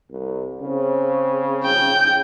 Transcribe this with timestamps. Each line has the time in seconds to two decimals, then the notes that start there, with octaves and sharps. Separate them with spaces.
0.10 C2
0.61 C#3 C4
1.64 G5 G6